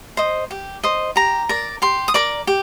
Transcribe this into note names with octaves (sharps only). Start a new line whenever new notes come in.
C5 D#5
G4
C5 D#5
G4 A#5
A#4 D5
G4 C6
D#6
A#4 D5 D6
G4